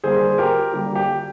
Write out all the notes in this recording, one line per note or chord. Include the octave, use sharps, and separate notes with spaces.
D3 G3 A#3 G#4 C5
G4 A#4
D3 G3 A#3 G4
G4